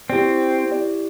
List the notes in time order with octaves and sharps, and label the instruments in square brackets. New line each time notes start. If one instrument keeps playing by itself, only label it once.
[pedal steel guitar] C4 [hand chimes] E4 G4 D5
[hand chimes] E4 G4 D5